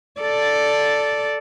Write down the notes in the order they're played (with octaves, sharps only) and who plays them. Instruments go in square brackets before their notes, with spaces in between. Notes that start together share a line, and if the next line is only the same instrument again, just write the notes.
[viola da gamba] A4 D5